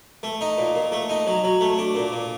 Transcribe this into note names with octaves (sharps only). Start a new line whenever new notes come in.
A3
D#4
A#2
A#2
A3
D#4
F#3
F#3
A3
D4
A#2
A#2